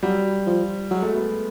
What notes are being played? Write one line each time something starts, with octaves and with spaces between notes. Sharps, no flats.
F#3 G3
F3
F#3 G#3
A3
B3